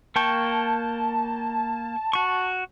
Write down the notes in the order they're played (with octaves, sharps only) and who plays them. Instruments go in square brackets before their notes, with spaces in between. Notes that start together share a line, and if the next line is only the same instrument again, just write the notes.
[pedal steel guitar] A#3 G5 C#6 [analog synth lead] A5
[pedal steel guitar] F#4 C#6